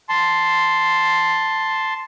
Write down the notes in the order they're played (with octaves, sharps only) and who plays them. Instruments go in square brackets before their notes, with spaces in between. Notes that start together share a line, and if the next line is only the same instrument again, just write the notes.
[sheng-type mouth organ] A5 C6